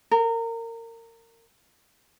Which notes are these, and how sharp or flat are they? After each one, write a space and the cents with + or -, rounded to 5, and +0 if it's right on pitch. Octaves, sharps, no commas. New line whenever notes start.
A#4 -25